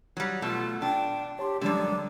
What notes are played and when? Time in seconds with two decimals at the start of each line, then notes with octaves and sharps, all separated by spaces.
0.17 F#3 G3
0.42 B2 A3 F4
0.82 D4 G5
1.39 G4 C#5 A5 C6
1.61 F#2 D3 F3 G3 G#3 D4